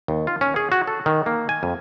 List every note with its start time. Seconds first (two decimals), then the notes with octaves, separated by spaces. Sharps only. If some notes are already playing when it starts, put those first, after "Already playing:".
0.08 D#2
0.27 F4
0.41 C#4
0.56 G#4
0.72 F#4
0.87 A4
1.06 D#3
1.26 A#3
1.49 G#5
1.63 F2